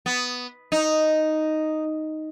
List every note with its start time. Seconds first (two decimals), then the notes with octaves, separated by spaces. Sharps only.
0.06 B3
0.72 D#4